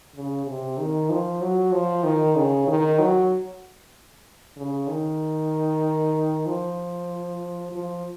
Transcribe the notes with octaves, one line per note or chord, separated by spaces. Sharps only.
C#3
C3
D#3
F3
F#3
F3
D#3
C#3
D#3
F#3
C#3
D#3
F3
F3